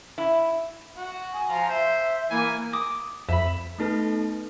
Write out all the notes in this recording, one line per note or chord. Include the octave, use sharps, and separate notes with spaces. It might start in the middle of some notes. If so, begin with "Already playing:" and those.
E4
F#4
G#5
F3 F4 A#5
C5 E5
E3 A#3 G#5
D6 D#6
F2 E5 B5
A3 B3 D#4 A4 B4